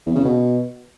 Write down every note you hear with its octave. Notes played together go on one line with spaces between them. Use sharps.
E2
C#3
B2